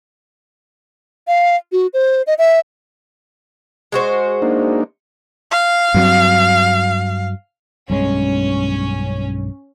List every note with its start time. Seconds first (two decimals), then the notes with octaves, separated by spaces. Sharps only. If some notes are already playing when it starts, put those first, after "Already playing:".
1.28 F5
1.72 F#4
1.93 C5
2.27 D#5
2.38 E5
3.92 G#3 F#4 C5
4.42 A#3 D4 D#4
5.51 F5
5.94 G2 F#3 C4
7.90 B1 G2 G#3 C#4